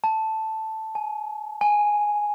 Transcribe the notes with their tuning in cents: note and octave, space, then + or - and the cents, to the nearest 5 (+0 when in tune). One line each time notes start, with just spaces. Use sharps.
A5 +0
G#5 +30
G#5 +0